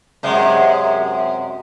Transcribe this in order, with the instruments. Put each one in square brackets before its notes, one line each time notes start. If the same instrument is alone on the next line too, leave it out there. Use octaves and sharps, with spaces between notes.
[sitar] F#2 C3 G#3